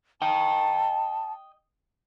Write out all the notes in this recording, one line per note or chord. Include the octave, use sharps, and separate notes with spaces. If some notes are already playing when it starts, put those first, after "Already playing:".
D#5 G5 A5